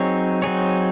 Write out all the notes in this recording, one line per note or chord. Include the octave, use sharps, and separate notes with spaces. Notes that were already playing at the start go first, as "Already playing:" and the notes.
Already playing: F#3 C4 D#4 G#4 C#5
F#3 C4 D#4 G#4 C#5